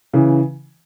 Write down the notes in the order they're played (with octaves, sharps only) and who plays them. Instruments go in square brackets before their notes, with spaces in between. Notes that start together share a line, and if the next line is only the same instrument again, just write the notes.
[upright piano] C#3 E3